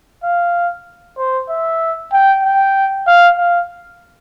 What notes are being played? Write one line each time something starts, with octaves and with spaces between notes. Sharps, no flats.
F5
C5
E5
G5
G5
F5
F5